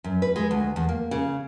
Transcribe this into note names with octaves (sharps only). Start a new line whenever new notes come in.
F#2
B4
G#3
D2
E2
A#3
C#3